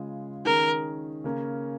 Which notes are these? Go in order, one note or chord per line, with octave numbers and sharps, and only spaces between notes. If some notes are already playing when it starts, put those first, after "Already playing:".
Already playing: C#3 G#3 F4 G#4
D#3 C#4 G#4 A#4
C#3 A#3 C#4 A#4